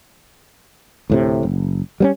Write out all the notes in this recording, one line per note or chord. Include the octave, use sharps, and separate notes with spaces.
D2 A2 C3
F#1
G3 B3 C#4